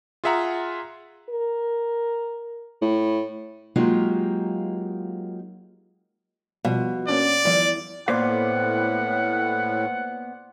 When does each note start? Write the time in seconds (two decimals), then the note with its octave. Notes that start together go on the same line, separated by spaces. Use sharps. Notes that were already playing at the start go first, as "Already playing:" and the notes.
0.24 F4 G#4 E5 F#5 A#5
1.29 A#4
2.82 A2
3.76 F#3 G#3 A#3 D#4 F4 G4
6.65 B2 F3 G3 F4
7.08 A#3 C#4 D4 D5
7.45 E2 D#3 F3 G3
8.08 A2 A#3 B3 C5 D5 F5 F#5 D6